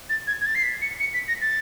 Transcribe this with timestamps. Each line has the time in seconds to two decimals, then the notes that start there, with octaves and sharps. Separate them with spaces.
0.09 A6
0.27 G#6
0.41 G#6
0.46 A6
0.55 C7
0.63 B6
0.82 C#7
1.00 C#7
1.14 B6
1.28 A#6
1.41 A6